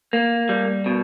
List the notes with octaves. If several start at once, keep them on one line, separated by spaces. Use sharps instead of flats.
A#3
G3
B2